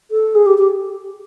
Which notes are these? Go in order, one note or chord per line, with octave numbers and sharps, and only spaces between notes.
A4
G#4
G4
G4